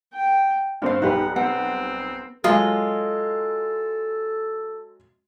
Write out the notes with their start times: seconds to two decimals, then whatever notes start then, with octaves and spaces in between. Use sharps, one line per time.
0.14 G5
0.82 G2 C4 D4 F5
1.02 B1 G3 D#4 G4 B4 F5 F#5
1.36 B3 C4 F#5
2.44 F#3 G#3 F4 A4 D#5